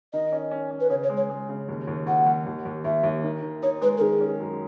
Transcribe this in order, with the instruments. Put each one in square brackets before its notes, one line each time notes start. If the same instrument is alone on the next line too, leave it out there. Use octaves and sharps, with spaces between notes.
[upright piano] D#3 [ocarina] D#5
[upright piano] C#4
C#4
C#4
[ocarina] B4
[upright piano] C#3 [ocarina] C#5
[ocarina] C#5
[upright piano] G#3
[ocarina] C#5
[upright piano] G#3
C#3
D#2
D#2
[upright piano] D#2 [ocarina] F#5
[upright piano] D#2
D#2
D#2
[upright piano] D#2 [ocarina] E5
[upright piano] D#2
D#3
D#3
[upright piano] D#4 [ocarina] C#5
[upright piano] G#3 [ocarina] B4
[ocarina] A#4
[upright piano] D#3 [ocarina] G#4
[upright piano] C#4
F#2